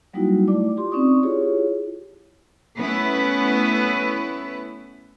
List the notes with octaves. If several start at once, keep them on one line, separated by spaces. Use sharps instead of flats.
F#3 G3 A#3 D#4 E4 F#4
A3 E4 D5 D6
F4 G4 C6
C4 C#4 D#4 D5 C#6 D#6
E4 F4 G4 G#4 C#5
A3 B3 C#4 E4 B4